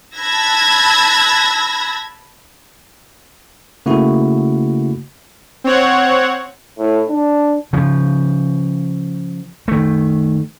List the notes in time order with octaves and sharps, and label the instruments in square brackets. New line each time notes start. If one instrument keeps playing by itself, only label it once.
[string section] A5 B5 E6 F#6 G#6 A#6
[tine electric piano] C#3 A3 A#3 E4 F#4
[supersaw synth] C4 C#5 F#5
[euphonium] A2
D4
[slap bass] C#3 F3
D#3 A3